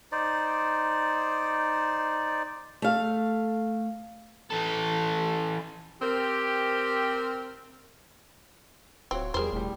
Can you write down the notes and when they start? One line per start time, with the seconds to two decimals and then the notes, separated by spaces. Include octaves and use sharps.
0.12 D#4 C5 D5
2.82 A3 F5
4.51 E3 A4
6.02 C4 G4 A#4
9.11 D1 C4 F4 F#4 C#5
9.34 E2 F3 G3 G#4 A#4 C5
9.53 E1 A2 G3